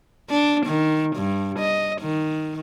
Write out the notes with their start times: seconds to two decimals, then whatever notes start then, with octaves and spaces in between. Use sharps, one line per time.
0.30 D4
0.66 D#3
1.16 G2
1.59 D#5
2.01 D#3